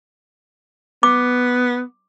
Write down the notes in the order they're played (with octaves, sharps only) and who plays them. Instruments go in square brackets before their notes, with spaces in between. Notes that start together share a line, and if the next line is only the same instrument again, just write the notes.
[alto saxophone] B3 [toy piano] D6